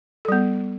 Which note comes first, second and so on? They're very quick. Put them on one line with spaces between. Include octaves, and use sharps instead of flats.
A4 G3 B3